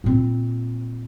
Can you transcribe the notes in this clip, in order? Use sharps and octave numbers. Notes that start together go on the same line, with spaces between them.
A#2 C4